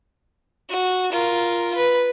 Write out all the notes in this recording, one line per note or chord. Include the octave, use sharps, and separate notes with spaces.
F#4
F4 A#4
B4